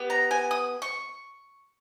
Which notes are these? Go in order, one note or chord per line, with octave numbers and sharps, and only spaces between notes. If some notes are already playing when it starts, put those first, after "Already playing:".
Already playing: B3 G4
A#5
G#5
D#6
C#6